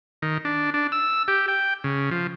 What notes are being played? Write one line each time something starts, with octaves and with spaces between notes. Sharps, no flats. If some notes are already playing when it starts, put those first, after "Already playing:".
D#3
D4
D4
E6
G4
G5
C#3
F3